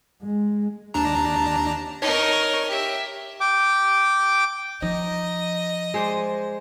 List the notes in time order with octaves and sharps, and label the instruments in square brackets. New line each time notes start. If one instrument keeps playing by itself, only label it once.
[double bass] G#3
[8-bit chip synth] D#2 D4 A#5 [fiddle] A5
[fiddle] D#4 A#4 [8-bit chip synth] C#5
[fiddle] G4 E5
[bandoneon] G5 D6
[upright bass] F3 [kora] D#4 [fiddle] D#5
[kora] G#3 C5 D5